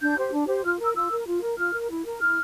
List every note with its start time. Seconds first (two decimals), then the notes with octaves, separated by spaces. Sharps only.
0.01 D4 G6
0.17 G4 C5
0.32 D4
0.48 G4 C5
0.64 F4 F6
0.79 A#4
0.84 E6
0.95 F4 E6
1.11 A#4
1.27 F4
1.42 A#4
1.58 F4 F6
1.73 A#4
1.90 E4
2.05 A#4
2.20 E4 F6